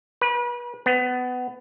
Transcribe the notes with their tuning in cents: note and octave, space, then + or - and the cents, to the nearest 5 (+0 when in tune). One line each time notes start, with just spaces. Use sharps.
B4 -35
B3 +20